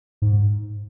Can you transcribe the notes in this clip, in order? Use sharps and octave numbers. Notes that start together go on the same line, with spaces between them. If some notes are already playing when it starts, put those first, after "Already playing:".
G#2